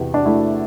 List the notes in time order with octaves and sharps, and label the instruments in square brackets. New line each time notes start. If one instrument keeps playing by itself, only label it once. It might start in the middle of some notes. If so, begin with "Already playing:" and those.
Already playing: [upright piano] E2 C3 G4
D4
A3 E4